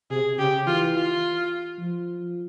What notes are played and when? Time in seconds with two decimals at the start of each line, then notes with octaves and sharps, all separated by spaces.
0.11 C3 G#4
0.39 C#3 G4
0.67 E3 F4
0.95 F4
1.79 F3